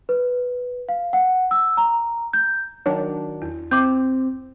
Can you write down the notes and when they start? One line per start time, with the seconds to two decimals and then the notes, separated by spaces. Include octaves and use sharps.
0.09 B4
0.89 F5
1.13 F#5
1.51 E6
1.77 A#5
2.33 G6
2.86 D#3 F#3 D4 C#5
3.42 E2
3.71 C4 D6 G6